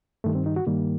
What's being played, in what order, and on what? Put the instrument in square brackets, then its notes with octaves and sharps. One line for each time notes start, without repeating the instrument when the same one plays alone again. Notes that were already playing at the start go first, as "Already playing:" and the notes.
[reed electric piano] G2 D#3 G3 A3
C4
D#4
F#4
G2 D#3 G3 A#3